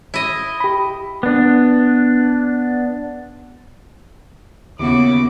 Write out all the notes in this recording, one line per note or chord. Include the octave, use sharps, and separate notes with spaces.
E4 D#5
G4 B5
B3 D4
D#2 C#3 B3 E4 F#4 D6